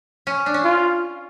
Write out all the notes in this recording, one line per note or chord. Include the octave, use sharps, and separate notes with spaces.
C#4
D4
C#4
F4